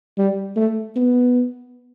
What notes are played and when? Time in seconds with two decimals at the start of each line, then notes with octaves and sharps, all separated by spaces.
0.18 G3
0.57 A3
0.96 B3